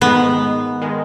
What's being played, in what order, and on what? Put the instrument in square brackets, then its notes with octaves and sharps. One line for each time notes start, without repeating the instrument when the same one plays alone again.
[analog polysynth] G#2 D#3 G#3 [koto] B3
[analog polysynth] D#3 G#3